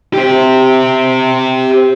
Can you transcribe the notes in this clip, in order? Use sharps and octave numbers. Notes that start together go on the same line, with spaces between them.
G4 C5